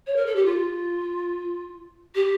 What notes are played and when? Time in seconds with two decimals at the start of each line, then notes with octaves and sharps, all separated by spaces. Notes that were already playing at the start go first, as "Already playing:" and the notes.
0.06 C#5
0.16 A#4
0.26 A4
0.36 G4
0.45 F4
2.15 G4